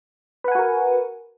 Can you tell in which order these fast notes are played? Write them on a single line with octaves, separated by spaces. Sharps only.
B4 F#5 G#5 F#4 A#4